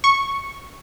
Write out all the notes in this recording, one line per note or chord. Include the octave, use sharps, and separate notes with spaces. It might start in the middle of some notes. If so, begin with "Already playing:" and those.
C#6